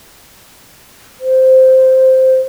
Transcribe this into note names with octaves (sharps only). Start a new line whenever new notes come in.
C5